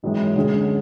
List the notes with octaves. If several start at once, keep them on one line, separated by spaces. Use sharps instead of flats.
G#1 F#2 E3 G#3
D2 D3 G#3 C#4 G#4